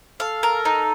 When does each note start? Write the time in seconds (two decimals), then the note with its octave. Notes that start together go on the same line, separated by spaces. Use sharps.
0.20 A4 F5
0.43 A#4
0.65 D#4